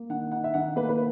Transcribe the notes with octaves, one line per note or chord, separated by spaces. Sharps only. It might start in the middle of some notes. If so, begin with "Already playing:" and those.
Already playing: A#3
D#3 F#5
D#4 F#5
E5
D#3 F#5
A#3 B4
B4